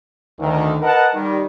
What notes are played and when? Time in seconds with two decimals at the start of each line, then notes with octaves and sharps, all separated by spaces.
0.39 D2 D#3
0.81 A#4 B4 D#5 F#5 A5
1.13 D#3 G3